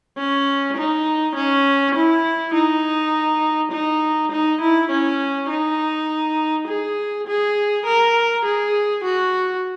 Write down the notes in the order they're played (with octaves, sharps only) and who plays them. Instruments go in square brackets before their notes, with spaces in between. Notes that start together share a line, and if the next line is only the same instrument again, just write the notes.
[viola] C#4
D#4
C#4
E4
D#4
D#4
D#4
E4
C#4
D#4
G#4
G#4
A#4
G#4
F#4